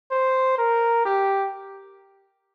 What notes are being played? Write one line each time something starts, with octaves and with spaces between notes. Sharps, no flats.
C5
A#4
G4